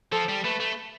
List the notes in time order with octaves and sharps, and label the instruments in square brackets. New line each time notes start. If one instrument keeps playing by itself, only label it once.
[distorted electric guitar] F3 [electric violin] A4
[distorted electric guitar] G3
[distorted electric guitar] A3 [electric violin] B4
[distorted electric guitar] A3